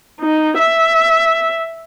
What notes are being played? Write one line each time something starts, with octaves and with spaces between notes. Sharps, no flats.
D#4
E5